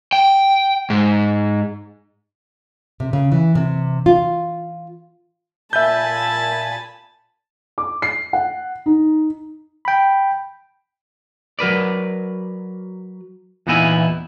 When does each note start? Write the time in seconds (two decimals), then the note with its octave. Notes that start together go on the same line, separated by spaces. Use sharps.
0.13 G5
0.90 G#2
3.00 C3
3.13 C#3
3.32 E3
3.55 C3
4.06 F4
5.73 A#2 E5 G#5 A5 B5 G6
7.78 D6
8.02 C7
8.33 F#5
8.86 D#4
9.85 G5 B5
11.59 F#3 A#4 B4 D5
13.67 E2 A#2 B3 D#4 E4 G#5